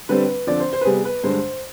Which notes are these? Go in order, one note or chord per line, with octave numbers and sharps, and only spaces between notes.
D3 G3 C4 B4
D3 F3 C4 D5
C5
C5
B4
C3 G3 B3 G#4
B4
G2 D3 G#3 C5